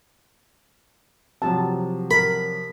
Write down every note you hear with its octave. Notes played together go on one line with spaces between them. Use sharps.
C3 F3 F#3 A5
A#4 B5